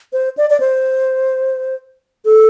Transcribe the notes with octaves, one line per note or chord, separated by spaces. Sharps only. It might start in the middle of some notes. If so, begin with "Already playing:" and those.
C5
D5
D5
C5
A4